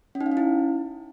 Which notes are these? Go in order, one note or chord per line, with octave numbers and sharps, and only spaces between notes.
C#4
D#4
F5
C#4
E4